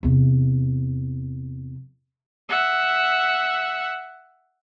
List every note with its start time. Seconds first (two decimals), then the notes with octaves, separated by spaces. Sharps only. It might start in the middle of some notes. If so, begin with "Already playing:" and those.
0.03 E2 C3
2.49 E5 F#5